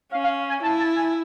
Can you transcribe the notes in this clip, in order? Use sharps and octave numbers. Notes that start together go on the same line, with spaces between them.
C#4 F5
F5
G#5
E4 A5
A5
G#5